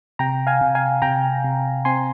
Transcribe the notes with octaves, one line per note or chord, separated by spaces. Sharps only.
C3 G5 A#5
F5 G#5
C3
F5 G#5
C3 G5 A#5
C3
C4 G#5 C6